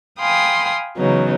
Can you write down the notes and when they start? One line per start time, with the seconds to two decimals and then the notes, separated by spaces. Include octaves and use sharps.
0.19 F5 G5 G#5 B5 C6 D#6
0.97 C#3 E3 F#3 B3 D#4